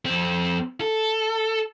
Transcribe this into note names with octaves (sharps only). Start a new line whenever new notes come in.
F2 C4
A4